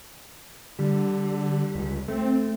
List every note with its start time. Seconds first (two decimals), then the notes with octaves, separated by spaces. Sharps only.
0.79 D3 G3
1.75 C#2
2.08 A3 C4